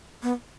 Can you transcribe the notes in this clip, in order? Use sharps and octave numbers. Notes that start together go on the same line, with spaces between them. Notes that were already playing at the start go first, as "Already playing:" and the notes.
B3